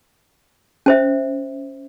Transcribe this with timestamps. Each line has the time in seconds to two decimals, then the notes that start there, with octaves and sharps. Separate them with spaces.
0.86 C#4 C5 E5